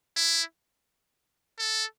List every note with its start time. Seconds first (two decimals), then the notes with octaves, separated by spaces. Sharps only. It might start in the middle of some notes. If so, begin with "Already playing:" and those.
0.16 E4
1.59 A4